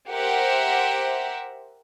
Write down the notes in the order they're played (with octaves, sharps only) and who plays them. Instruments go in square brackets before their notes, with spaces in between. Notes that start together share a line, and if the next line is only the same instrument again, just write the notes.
[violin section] G4 A#4 C5 E5 F#5